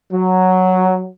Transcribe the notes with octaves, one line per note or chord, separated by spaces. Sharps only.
F#3